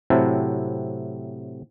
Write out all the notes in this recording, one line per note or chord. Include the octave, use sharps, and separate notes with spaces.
A2 C3 F#3 C4 E4 A5